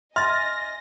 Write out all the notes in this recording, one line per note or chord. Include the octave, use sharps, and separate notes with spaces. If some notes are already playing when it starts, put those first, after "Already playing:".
D#5 E5 G#5 C6 F6 A6 A#6